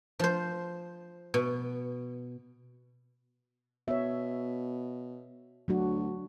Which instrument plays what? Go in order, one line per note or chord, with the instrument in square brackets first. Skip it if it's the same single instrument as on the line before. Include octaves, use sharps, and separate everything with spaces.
[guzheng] F3 C5
B2
[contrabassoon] B2 [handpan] C#5 E5
[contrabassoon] D2 [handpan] F#3 D4 F#4